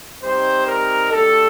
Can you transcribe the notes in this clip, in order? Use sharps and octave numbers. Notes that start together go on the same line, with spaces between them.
G3 C4 D#4 G4 C5
A#4
A3 D4 G4 A4